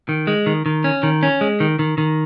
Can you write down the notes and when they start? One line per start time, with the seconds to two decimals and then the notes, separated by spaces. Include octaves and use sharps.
0.09 D#3
0.27 G#3
0.46 D#3
0.66 D#3
0.84 C#4
1.03 D#3
1.23 C#4
1.41 G#3
1.60 D#3
1.79 D#3
1.98 D#3